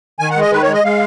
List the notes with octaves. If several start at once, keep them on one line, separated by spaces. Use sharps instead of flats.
D#3 G#5
F#5
G#3
D#5
D#3 B4
C#5
G#3
D#5
G#3 F5